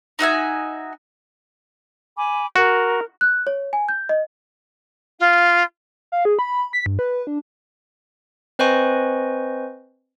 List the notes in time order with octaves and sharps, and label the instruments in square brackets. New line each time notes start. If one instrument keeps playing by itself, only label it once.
[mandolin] D#4 F#4 E5 G#5
[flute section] G#5 B5 D6
[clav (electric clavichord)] F#4 [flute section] A#4
[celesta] F#6
C#5
G#5
G6
D#5
[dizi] F4
[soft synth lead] F5
G#4
B5
B6
G2
B4
D4
[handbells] C4 B4 C5 D#5 G#5 C#6